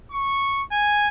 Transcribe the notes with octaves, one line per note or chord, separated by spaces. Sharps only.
C#6
G#5